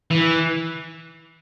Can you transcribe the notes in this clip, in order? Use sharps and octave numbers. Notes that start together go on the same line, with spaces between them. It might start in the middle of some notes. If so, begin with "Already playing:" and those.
E3